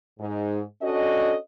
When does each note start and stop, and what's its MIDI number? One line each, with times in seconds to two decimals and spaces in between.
0.19 0.60 44
0.82 1.35 61
0.82 1.35 62
0.82 1.35 66
0.82 1.35 69
0.82 1.35 75